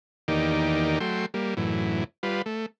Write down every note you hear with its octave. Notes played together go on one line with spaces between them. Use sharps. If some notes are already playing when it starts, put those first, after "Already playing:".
E2 D#3 A#3 D#4 G4 D5
F#3 A3 G5 C6
G3 A#3
F#2 A2 E3
G3 F4 B4
A3